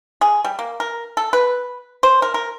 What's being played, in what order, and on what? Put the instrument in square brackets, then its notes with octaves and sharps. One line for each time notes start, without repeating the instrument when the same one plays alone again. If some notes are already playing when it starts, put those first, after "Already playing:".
[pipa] G#4
G3
A#3
A#4
A4
B4
C5
A#4
A#4